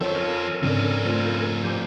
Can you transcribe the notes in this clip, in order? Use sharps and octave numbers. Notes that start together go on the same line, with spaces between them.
F2 D#3 F3 C4 A4 C5 C#5
A4 A#4 G#5
F2 G#2 C#3 C4 D4 D5
A3 F4 C5
F3 G4 C5 G#5